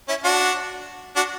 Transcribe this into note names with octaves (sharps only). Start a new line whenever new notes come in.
C#4 E4
D4 F#4
D4 F#4